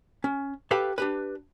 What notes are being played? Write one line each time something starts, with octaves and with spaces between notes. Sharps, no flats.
C#4
G4 A4 B4 F5 G5 A5
D4 G4 B4